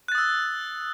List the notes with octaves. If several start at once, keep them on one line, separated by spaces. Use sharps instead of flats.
D#6 E6 F#6 A6